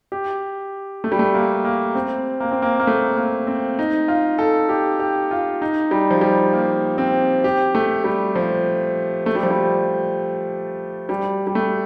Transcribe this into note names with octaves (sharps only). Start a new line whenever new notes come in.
G4
A3
G3
A3
A#3
A#3
C4
A#3
C4
A#3
A#3
A3
A#3
C4
D#4
F4
A4
G4
G4
F4
D#4
G3
F3
G3
A#3
C4
G4
A3
G3
F3
A3
G3
F3
G3
G3
G3
A3